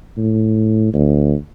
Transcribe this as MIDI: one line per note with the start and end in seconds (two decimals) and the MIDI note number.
0.18 0.94 45
0.94 1.34 38